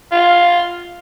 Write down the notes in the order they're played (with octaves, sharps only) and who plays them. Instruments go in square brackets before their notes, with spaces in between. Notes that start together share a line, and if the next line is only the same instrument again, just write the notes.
[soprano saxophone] F4